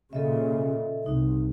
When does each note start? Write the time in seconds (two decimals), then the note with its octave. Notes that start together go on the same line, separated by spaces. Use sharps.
0.13 A#2 C#3 A4 D#5 E5
1.06 C2 D#4